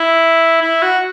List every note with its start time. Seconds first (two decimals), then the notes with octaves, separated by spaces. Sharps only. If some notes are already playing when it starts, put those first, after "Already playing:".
Already playing: E4
0.62 E4
0.82 F#4